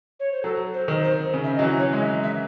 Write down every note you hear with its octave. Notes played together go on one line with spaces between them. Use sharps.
C#5
C5
F#3 A4
C5
D#3
C5
C#3
E5
D#5
F#3
E3
C#5
G#3
E5
E5